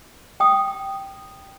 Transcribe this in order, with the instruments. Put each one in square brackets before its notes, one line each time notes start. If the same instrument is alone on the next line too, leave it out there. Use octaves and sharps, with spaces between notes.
[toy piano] G5 D#6